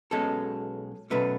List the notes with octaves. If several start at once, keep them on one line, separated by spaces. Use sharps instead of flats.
B1 B2 G#3 C#4 A4
B2 F#3 A3 C#4 B4